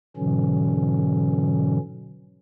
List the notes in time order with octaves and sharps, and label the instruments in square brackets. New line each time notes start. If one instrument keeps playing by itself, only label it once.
[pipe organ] G#2 B2 D3 E3 F#3 C#4